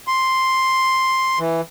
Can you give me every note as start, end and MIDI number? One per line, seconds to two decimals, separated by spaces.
0.07 1.39 84
1.39 1.61 52